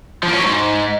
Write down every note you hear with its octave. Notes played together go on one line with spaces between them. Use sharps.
F3
A#3
C#4
F#3
G#2